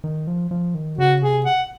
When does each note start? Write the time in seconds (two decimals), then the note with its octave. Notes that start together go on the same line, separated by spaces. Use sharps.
0.04 D#3
0.27 F3
0.51 F3
0.75 D#3
0.98 C#3 F#4
1.22 C3 G#4
1.45 F#5